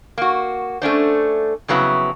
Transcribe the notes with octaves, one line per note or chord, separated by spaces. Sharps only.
A#3 F#4
A3 C#4 D4 C5
F2 C#3 F#3 B3 E4